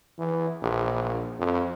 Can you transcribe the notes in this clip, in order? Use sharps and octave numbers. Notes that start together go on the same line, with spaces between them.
E3
A#1
F2